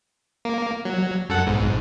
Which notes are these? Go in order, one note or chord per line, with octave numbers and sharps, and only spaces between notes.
A#3
F#3
F#2 A4 F#5
B1 G#2